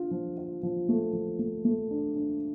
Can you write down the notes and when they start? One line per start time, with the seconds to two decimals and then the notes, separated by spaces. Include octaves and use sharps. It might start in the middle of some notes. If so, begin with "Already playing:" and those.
Already playing: D4 F4
0.11 F3
0.38 F4
0.63 F3
0.89 A3
1.13 F3
1.39 A3
1.65 A3
1.91 D4
2.15 D4